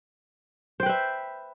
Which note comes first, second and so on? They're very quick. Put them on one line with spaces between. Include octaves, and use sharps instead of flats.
C5 G5 B4 E5